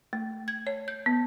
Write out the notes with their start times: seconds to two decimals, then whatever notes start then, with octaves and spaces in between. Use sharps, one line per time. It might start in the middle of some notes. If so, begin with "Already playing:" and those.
0.13 A3
0.48 G#6
0.67 C#5
0.88 G6
1.06 B3